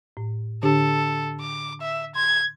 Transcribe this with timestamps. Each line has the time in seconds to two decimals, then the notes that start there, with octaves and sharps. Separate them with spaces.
0.17 A2
0.63 D3 D4 G4 A4
1.40 D6
1.81 E5
2.15 C6 G#6